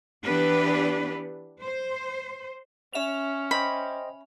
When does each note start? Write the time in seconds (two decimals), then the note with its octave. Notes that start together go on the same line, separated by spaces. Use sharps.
0.25 E3 B3 D4 G4 B4
1.61 C5
2.93 C#4 E5 F7
3.51 C5 D#5 G5 B5